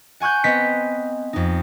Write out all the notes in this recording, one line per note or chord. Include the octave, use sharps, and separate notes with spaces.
F#5 G#5 C#6 F#6 G6
B3 C4 D#5 B6 C#7
F2 D#4